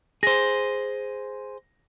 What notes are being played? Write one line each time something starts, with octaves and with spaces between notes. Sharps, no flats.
G#4 C5 A#6